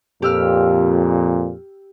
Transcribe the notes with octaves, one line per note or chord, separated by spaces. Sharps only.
F2 A#2 G4 E6 F6